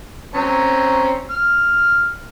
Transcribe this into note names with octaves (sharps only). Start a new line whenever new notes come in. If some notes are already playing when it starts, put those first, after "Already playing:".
C4 C#4 A#5
F6